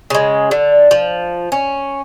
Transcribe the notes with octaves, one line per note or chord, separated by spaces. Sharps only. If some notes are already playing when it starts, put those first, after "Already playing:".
C#3 G#3
D3
F3
C#4